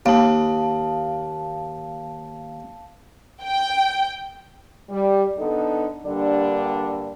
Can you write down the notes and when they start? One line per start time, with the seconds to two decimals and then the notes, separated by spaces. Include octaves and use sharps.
0.06 D#2 F5 A5
3.44 G5
4.90 G3
5.38 D3 B3 D#4 A4
6.06 G2 D3 G3 A#3 D4